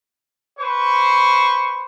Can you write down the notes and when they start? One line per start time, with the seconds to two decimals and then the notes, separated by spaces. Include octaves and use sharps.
0.58 B4 C5 C#6